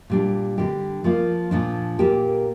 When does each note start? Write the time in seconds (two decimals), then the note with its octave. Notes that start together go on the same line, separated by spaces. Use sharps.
0.10 A#2 G3 D4
0.58 D3 G3 C4 G4
1.04 F3 A#3 F4
1.51 A#2 F3 D4
1.99 A#2 A#3 G4